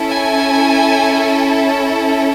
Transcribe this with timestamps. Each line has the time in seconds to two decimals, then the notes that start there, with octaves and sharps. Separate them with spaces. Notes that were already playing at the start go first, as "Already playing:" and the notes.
Already playing: C#4 E4 A4
0.11 G#5